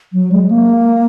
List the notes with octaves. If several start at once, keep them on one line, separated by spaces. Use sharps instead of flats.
F#3
G#3
A#3